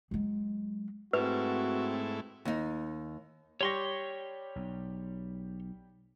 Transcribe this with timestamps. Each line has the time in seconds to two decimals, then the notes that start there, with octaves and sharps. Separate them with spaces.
0.11 F#3 G#3
1.13 G#2 A3 C4 E4 F#4 B4
2.45 D#2 D#4
3.61 G3 G4 C#5 C6 C#6 A#6
4.56 B1